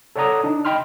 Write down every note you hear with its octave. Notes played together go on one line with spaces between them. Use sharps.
A4 C#5 D5 F#5 A#5 D#6
D4 D#4
D#5 G5 B5 C6 F6